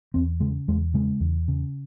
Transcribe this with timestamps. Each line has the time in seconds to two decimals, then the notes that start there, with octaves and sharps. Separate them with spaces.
0.14 E2 C4
0.40 C#3 G#3
0.68 E2 G#3
0.94 C#3 G#3
1.20 E2
1.48 C#3